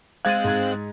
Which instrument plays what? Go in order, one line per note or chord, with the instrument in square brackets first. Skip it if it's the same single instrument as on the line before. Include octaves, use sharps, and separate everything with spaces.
[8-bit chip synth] G#3 C4 F#6 [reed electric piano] F5 [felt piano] G#6 A6 D#7
[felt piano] G#2 G#6